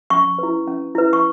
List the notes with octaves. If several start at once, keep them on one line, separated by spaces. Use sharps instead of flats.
C#4 C#6
E4 B4
C#4
E4 B4
C#6